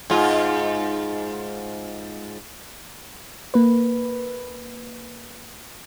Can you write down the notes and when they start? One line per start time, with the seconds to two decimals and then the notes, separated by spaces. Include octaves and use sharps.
0.10 G#2 F4
3.54 A#3 B4